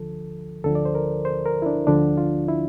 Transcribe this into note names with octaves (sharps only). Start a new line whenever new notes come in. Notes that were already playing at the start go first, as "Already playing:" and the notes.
Already playing: D2 D3 F3 A4
D2 D3 F3 A4
D5
C5
A#4
C5
A#4
E4
D4
D2 D3 F3 D4
F4
E4